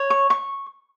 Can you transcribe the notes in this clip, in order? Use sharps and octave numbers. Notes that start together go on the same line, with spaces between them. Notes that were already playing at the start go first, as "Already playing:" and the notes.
Already playing: C#5
C#6
C#6